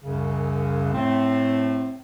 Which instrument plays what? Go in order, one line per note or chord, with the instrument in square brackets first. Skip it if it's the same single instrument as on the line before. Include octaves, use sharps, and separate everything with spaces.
[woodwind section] C2 F#2 C#3
A2 A3 C4